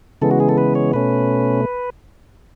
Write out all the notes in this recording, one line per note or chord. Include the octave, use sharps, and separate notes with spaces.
C#3 E3 G#3 B3 A4
F#4
G#4
A4
B4
C#5
B2 A3 C#4 B4